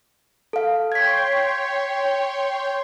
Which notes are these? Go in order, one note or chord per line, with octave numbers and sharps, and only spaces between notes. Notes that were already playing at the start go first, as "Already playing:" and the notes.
A4 F5
C#5 G5 C6 G#6 B6